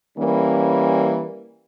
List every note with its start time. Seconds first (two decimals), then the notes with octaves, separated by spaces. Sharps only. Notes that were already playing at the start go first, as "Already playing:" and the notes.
0.17 E3 G3 A#3 C#4